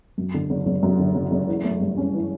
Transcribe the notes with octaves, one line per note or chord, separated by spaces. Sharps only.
F#2
D3
F#1
F#1
F#2
D3
F#1
F#1
E3
A3
G2
C#4
E3